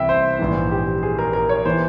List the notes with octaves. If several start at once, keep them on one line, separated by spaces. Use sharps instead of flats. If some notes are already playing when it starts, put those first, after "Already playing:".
Already playing: C2 C3 E3 E5 G5
C5
A#1 G#2 E3
G4
G#4
A#4
A#4
C#5
E3 C5